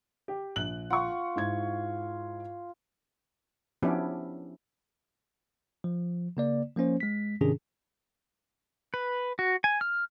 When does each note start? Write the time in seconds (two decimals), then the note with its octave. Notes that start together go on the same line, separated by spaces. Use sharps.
0.28 G4
0.56 A#1 F#6 F#7
0.90 F4 F#5 C#6
1.36 G#2 E4 G#6
3.82 F3 B3 C#4 D4 E4 G4
5.84 F3
6.37 C#3 A#3 D5
6.76 F3 A#3 C#4 C5
7.00 G#3 B6
7.41 G#2 C3 D#3 C#4 D4 G#4
8.94 B4
9.39 F#4
9.64 G#5
9.81 F6